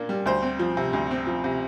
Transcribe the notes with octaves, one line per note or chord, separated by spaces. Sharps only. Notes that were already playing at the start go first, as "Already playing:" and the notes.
Already playing: A#2 A#3 D4
G3
D2 C5
C4
F3
C3
D2
C4
F3
C3